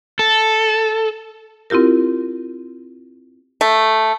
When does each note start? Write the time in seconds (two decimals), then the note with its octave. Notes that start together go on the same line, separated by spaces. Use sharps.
0.19 A4
1.70 C4 E4 F4 G4 A#4
3.61 A3